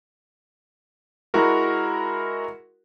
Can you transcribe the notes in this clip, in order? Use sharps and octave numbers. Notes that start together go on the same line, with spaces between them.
G#3 E4 F#4 A#4